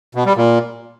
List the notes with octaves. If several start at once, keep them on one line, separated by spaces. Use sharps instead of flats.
B2
G3
A#2